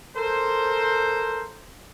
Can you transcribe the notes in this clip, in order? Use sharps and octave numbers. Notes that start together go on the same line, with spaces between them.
A4 A#4 C5